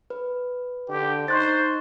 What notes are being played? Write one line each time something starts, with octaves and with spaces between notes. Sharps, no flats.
B4
D3 G4
D#4 C5 C#6 F#6 A6